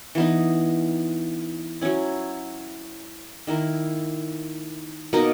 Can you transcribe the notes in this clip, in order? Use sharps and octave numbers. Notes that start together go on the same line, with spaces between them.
E3 B3 D#4
F#3 C#4 E4
D#3 A#3 E4 A#4
B2 A#3 D#4 A#4